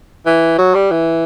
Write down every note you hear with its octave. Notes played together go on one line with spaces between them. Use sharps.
E3
F#3
G3
E3